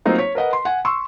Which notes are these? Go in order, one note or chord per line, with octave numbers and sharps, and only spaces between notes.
F#3 A#3 C4 D#4 F4
C#5 B6
A#4 B4 D#5 F#5
C6
F#5 G#5
C6 C#6 E6